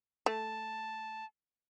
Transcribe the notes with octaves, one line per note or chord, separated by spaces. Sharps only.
A3 A5